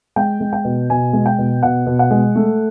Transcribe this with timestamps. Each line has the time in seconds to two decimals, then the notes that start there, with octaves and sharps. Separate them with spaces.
0.16 G#3 G5
0.40 G#3
0.53 G5
0.65 B2
0.90 B2 G#5
1.13 G#3
1.26 G5
1.38 B2
1.63 B2 F#5
1.86 B2
1.99 F#5
2.11 G#3
2.35 A3